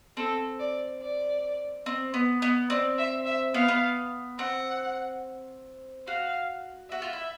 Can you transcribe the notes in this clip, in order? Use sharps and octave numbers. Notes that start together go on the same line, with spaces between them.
C4 A4
D5
D5
C4
B3
B3
C4 D5
E5
E5
B3 F5
B3
C4 F#5
F#4 F5
F#4 E5
F4
E4